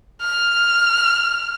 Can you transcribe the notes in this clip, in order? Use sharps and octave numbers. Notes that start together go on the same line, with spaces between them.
F6